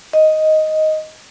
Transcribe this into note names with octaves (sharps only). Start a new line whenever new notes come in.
D#5